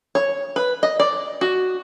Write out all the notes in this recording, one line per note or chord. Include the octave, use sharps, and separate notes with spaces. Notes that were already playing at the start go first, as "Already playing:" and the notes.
C#5
B4
D#5
D5
F#4